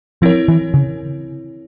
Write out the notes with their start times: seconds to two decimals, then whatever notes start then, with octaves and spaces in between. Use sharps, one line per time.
0.22 F3 C4 E4 A#4 C#5
0.48 E3
0.74 C#3